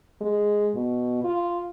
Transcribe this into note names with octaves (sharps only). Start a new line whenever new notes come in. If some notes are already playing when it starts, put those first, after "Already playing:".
G#3
B2
F4